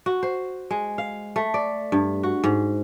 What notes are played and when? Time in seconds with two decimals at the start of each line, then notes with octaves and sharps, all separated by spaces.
0.06 F#4
0.23 C5
0.71 G#3
0.98 F5
1.36 A3
1.54 D5
1.92 G2
2.23 F#4
2.44 G#2